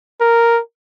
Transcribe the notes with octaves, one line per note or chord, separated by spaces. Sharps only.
A#4